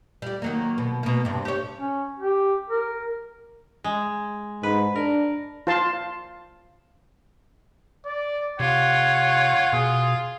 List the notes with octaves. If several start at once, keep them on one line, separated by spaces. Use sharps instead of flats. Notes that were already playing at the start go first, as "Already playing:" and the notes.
G3 G4
D#3 F#3 A#3
B2
B2 A#3
G2 C3
G4 C#5
C#4
G4
A#4
G#3
G#2 B4
D4 A#4
F4 C5 A5 C6
D5
C3 F4 C#5 F#5
B2 G#4